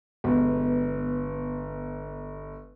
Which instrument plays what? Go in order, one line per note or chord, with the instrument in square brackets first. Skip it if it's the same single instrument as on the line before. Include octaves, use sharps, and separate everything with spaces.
[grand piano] G1 [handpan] G#3 B3